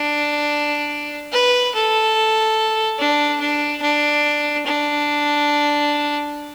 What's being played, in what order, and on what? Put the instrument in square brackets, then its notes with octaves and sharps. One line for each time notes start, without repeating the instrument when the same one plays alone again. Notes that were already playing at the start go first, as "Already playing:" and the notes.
Already playing: [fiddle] D4
B4
A4
D4
D4
D4
D4